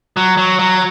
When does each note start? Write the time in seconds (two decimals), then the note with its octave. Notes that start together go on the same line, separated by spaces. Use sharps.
0.17 F#3
0.37 F#3
0.59 F#3